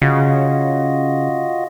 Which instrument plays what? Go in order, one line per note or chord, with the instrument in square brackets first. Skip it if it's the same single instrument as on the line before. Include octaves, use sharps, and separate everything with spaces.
[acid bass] C#3 [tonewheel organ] F4 F#4 D#5